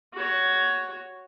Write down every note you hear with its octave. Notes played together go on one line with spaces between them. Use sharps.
F#4 C#5